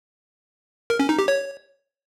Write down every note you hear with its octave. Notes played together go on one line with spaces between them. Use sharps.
A#4
C#4
D#4
G4
C#5